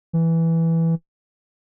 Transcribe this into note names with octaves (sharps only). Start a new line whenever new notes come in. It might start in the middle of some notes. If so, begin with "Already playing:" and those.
E3